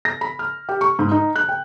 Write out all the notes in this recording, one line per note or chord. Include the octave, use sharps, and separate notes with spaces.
A#6
B5
F6
G4
C#6
G#2
D#4
F#6
G5